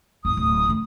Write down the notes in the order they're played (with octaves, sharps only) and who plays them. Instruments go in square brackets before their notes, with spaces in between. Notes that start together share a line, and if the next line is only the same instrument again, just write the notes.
[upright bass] D#2 A2 [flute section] D#6
[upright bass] D1
D3 A3